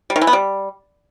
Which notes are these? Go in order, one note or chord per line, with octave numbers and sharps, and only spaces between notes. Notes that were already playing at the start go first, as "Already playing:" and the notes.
G3
D#3
E3
B3
G3